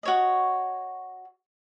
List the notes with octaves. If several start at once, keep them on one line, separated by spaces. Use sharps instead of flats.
F#4 C#5 D#5